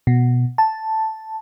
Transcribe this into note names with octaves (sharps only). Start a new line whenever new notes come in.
B2
A5